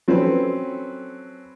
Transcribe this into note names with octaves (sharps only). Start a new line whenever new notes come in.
F#3 C4 C#4 A4 B4